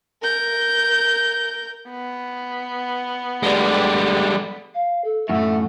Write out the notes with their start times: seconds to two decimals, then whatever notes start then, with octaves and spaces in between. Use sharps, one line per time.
0.23 A#4 G6
1.90 B3
3.43 G2 D3 G3 G#3 D4
4.74 F5
5.04 A4
5.29 F#2 A2 A3 E5 F#5